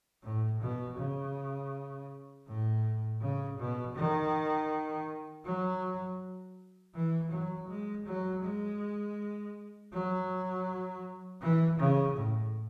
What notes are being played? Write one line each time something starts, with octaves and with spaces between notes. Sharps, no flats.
A2
B2
C#3
A2
C#3
B2
D#3
F#3
E3
F#3
G#3
F#3
G#3
F#3
E3
C#3
A2